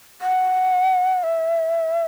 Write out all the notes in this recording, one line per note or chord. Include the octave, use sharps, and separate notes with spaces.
F#5
E5